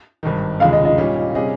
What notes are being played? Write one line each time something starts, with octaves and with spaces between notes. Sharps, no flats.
G#1 G2 D#3
F1 D#2 C#3 G#3 F5
D#5
D#5
A#2 G3 C#4
C3 G3 C#4 G#4 D#5